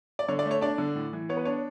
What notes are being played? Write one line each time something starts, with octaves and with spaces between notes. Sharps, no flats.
D5
D3 C#5
D5
A3
C#5
D4 D5
D3
A2
E3
B3 C#5
B4
D4 C#5